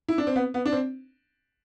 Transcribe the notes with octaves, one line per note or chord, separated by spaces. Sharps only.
E4
D4
C4
B3
B3
D4
C4